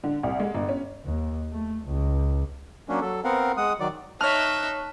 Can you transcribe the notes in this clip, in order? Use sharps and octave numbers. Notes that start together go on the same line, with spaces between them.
D3
C2
G#3
G1
C#4
D#2
A3
C#2
F#3 A#3 C#4 D4
F#3 A4
B3 C4 A#4 F5 F#5
G#3 F#5 D#6
D#3 F#3 D5
D#4 C#5 E5 A5 F6 F#6